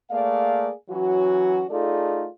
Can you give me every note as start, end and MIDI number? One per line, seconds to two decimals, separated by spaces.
0.11 0.72 57
0.11 0.72 58
0.11 0.72 68
0.11 0.72 74
0.11 0.72 77
0.90 1.64 52
0.90 1.64 54
0.90 1.64 61
0.90 1.64 66
1.70 2.27 57
1.70 2.27 63
1.70 2.27 65
1.70 2.27 68
1.70 2.27 69
1.70 2.27 74